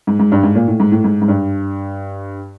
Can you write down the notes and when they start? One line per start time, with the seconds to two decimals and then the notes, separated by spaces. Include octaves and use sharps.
0.07 G#2
0.19 G#2
0.32 G2
0.43 G#2
0.55 A#2
0.68 A2
0.80 G#2
0.92 A2
1.04 G#2
1.22 G#2
1.28 G2